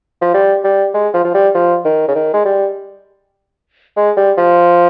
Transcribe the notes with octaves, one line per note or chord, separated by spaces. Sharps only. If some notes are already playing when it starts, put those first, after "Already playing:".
F3
G3
G3
G#3
F3
F3
G3
F3
D#3
C#3
D#3
G#3
G3
G#3
G3
F3